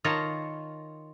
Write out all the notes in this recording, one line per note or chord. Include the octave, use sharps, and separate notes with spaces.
D#3 F4 C#5 A5 A#5